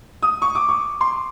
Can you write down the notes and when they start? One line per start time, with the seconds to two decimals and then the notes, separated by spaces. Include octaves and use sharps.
0.23 D#6
0.42 C#6
0.55 D6
0.69 C#6
1.01 C6